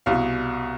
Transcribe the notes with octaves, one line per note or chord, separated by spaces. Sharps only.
C2 B2 F5